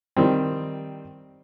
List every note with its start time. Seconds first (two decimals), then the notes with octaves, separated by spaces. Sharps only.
0.17 D#3 G3 C4